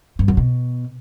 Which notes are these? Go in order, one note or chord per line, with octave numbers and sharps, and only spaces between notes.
G2
F#2
B2